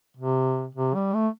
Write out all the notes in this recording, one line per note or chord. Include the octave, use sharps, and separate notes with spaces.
C3
C3
G3
A3